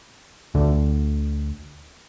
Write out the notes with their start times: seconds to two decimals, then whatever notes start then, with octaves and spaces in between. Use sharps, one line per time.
0.55 D2 D3